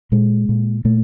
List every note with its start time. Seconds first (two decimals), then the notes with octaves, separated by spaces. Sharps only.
0.12 A#2 G#3
0.49 A#2
0.85 A#2 A3